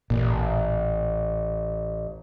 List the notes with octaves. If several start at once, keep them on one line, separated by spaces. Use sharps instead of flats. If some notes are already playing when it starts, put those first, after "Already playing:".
A1 A#2